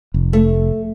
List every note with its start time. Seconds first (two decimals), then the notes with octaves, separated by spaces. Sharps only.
0.14 F1
0.33 A3